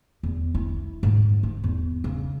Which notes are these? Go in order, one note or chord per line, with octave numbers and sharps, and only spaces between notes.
E2
E4
G#2
D#4
E2
C#3